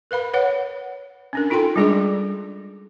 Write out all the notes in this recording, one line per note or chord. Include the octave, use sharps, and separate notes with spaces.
A#4 B4 F5 B5
B4 C#5 F#5
C#4 D4 A#4
D#4 F4 A4 G5 C6
G3 G#3 D4 G#4 D5 D6